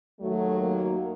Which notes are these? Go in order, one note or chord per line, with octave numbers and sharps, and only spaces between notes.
D#2 D#3 F#3 A3
A#3